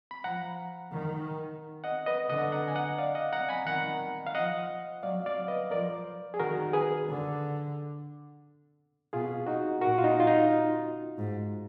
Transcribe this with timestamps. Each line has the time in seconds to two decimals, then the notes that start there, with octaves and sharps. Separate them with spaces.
0.11 B5
0.24 F3 F#5 A#5
0.93 D#3
1.84 D#5 F#5
2.06 B4 D#5
2.30 D3 D#5 F#5
2.52 F#5 A#5
2.68 G#5
2.75 D#5 F#5
2.98 D5 F5
3.15 D#5 F#5
3.33 F#5 A#5
3.49 G#5 B5
3.66 D#3 F#5 A#5
4.27 F5
4.35 F3 D#5 F#5
5.03 F#3 D5 F5
5.26 D5 F5
5.48 B4 D#5
5.71 F3 A#4 D5
6.34 G#4
6.39 D#3 F#4 A#4
6.73 G#4 B4
7.09 D3
9.13 B2 F4 G#4
9.47 D#4 F#4
9.81 A#2 F#4 A#4
9.98 F4
10.04 D#4
10.20 F4
10.27 D#4
11.18 G#2